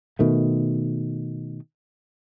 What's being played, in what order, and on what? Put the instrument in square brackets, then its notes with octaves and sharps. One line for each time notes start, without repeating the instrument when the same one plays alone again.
[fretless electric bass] B2 D#3 A3